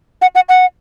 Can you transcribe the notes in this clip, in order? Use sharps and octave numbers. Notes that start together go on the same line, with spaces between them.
F#5
F#5
F#5